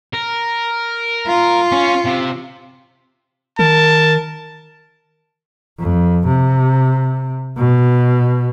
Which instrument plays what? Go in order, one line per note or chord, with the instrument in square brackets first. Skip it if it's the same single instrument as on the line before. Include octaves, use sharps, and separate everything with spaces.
[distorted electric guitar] A#4
[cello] F4
[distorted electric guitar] C#4
C3
[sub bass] D#3 [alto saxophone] A#4 [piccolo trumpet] A5
[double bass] F2
C3
B2